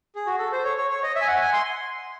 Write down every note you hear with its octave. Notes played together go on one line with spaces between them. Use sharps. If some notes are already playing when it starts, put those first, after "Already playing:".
G#4
F#4
A4
C5
C#5
C#5
C#5
D#5
E5
G#5
F#5
G#5
C6